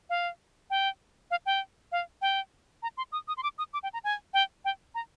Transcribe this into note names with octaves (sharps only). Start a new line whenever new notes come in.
F5
G5
F5
G5
F5
G5
A#5
C6
D#6
D#6
C6
D6
D#6
D6
G5
A#5
G#5
G5
G5
A#5